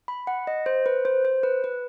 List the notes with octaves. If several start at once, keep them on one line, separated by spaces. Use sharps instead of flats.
B5
F#5
D#5
C5
B4
C5
C5
B4
B4